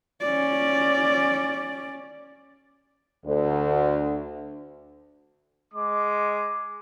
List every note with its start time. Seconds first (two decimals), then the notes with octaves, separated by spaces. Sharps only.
0.21 C#4 D5
3.25 D2
5.74 G#3 D6